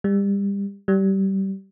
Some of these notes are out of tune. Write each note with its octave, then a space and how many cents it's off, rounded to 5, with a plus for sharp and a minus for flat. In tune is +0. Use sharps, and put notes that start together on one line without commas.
G3 +30
G3 -20